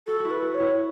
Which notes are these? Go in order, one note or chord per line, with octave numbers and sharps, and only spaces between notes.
F#4 A4
F#4
E4
B4
F#4
C#5
E4